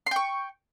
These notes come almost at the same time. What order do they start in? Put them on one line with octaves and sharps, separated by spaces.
C6 G5 C#6